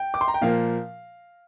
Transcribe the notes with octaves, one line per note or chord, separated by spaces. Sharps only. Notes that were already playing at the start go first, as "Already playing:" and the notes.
Already playing: G5
D6
C6
A#5
G5
A#2 F3 A#3 F5